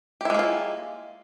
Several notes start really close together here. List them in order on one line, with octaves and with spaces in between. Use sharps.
G4 E4 G#3 A#3 F4